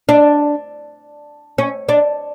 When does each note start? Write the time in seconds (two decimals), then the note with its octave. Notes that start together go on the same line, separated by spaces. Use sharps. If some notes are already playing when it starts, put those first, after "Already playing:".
0.09 D4
1.58 C#4
1.89 D4